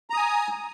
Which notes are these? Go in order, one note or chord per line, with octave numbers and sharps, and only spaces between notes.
G#5 A#5 D#6